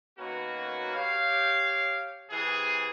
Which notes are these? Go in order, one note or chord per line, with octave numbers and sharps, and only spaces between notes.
B2 D#3 A#3 C#4 F#4
G4 C#5 F5
C3 E3 G#4